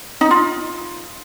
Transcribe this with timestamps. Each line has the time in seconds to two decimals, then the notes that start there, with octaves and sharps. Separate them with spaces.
0.21 D#4
0.31 F4